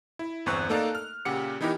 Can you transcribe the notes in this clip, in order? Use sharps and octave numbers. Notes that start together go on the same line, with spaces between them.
E4
G1 E2 C4 C#6 F#6
A3 A#3 D#4 A4 D5 F5
F6
A#2 C#3 G4 F#5 C#7
E3 B3 D#4 E4 G4 A#4